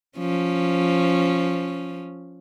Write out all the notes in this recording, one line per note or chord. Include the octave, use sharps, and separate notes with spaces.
F3 C#4